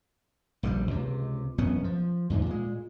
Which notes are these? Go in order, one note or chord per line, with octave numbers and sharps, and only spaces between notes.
A#1 D3 F3 G3
C#2 C3
E1 F#2 B3 C#4
F3
E2 G#2 D3
A#2 G#3